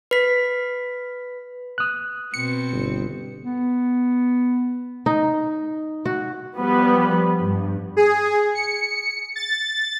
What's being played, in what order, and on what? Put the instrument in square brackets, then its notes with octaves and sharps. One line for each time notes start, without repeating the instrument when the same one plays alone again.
[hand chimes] B4 B6
[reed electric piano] D#6 F#6
[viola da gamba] B2 C4 [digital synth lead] C#7
[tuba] G1
[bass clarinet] B3
[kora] D#4
F#4
[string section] F3 G3 B3 B4
G2
[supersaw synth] G#4
C#7
A6